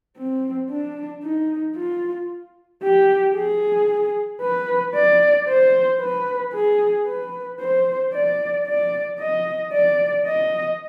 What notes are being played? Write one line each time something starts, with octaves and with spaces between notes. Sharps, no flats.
C4
D4
D#4
F4
G4
G#4
B4
D5
C5
B4
G#4
B4
C5
D5
D5
D#5
D5
D#5